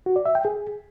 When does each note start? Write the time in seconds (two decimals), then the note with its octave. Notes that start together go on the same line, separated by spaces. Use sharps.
0.06 F#4
0.16 D5
0.26 E5
0.35 G5
0.45 G#4